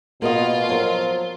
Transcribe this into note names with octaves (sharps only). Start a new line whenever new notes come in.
B2 A#3 B3 F4 D#5
F3 F#3 A#4